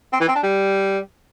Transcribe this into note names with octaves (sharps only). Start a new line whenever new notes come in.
C4
E3
C4
D4
G3